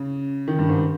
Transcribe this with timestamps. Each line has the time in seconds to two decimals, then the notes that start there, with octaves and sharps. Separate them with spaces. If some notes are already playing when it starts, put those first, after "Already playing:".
Already playing: C#3
0.48 D#3
0.58 G2
0.69 G#2